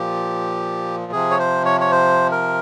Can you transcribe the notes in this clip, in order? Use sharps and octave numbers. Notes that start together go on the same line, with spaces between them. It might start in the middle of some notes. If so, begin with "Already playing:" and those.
Already playing: A#2 F3 G4
C3 F3 G#4
C#5
C5
C#5
C#5
C5
A#4